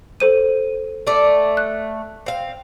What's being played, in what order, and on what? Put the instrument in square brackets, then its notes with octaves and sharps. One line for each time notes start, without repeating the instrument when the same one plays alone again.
[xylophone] A4 C5 D#7
[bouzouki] A3 D5
[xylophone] F#6
[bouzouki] C4 F5